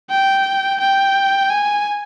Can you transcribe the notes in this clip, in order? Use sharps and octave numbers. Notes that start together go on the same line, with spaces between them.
G5
G5
G#5